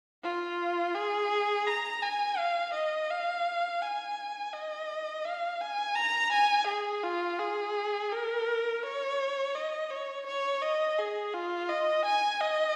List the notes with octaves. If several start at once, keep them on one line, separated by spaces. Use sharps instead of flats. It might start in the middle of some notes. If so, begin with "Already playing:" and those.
F4
G#4
A#5
G#5
F5
D#5
F5
G#5
D#5
F5
G#5
A#5
G#5
G#4
F4
G#4
A#4
C#5
D#5
C#5
C#5
D#5
G#4
F4
D#5
G#5
D#5